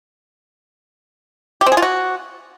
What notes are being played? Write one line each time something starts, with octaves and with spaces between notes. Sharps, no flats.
G4
C4
G#4
F4
F#4